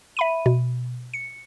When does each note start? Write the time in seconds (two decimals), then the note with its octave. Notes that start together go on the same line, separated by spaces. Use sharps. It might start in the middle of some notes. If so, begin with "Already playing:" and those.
0.17 E5 B5 D#7
0.46 B2
1.14 C#7